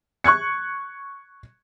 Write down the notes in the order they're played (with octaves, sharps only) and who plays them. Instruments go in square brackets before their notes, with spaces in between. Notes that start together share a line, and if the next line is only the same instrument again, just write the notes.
[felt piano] C#6 F#6 G#6 C#7